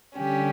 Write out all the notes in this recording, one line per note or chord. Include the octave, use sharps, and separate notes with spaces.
D3 G3 C#4 G4